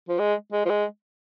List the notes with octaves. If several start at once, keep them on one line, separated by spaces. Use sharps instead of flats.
F3
G#3
G#3
F3
G#3